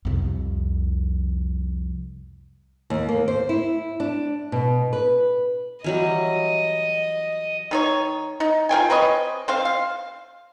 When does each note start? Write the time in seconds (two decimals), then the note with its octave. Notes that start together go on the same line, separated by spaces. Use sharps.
0.05 C2 F2
2.90 D#2
3.09 A#3
3.28 C5
3.49 E4
4.00 D4
4.52 B2
4.93 B4
5.84 E3 F#3 G3 D#5
7.71 D#3 D#4 C#5
8.40 D#4
8.69 F4 A#4 G5 G#5
8.90 C4 B4 C#5 D#5
9.48 C4 C5 F5
9.65 F5